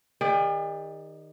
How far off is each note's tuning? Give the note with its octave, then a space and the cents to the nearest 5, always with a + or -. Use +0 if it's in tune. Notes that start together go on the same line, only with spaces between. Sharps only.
D#3 +0 G4 +45 D5 +0